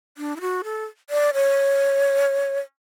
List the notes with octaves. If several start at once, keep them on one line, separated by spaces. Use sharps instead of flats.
D4
E4
F#4
A4
D5
C#5